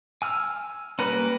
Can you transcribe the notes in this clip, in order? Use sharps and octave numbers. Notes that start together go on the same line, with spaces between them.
G#5 E6 F6
G3 A#3 C#4 B4 A#5